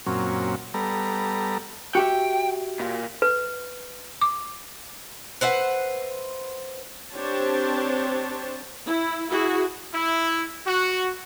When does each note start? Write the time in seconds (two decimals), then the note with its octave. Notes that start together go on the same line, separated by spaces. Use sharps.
0.06 F#2 A#2 F#3 C4 C#4
0.74 G3 B3 A4 A#5
1.95 F#4 G4 E5 G5
2.80 A#2
3.22 B4
4.22 D6
5.41 B4 C5 E5 F#5
7.13 C4 D4 G4 C5 C#5 A5
8.86 E4
9.30 E4 F#4 G#4
9.94 E4
10.67 F#4